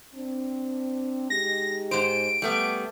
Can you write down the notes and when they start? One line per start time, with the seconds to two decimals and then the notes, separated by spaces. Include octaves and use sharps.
0.16 C4 D4
1.30 G#3 D#4 G4 A#6
1.91 G#2 C5 D7
2.42 G3 A3 B3